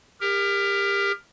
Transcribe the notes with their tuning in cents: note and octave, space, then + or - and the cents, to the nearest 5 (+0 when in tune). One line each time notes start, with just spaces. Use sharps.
G4 +30 A#4 +0